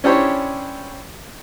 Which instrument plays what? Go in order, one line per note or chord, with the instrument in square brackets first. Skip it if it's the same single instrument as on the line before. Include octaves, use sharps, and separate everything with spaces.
[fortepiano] C#4 D4 E4 G4 C5 C#5